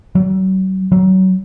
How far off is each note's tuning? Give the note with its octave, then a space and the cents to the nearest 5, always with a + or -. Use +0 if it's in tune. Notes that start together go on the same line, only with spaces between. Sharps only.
F#3 +40
F#3 +25